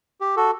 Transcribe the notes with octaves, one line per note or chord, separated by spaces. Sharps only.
G4
F#4 A4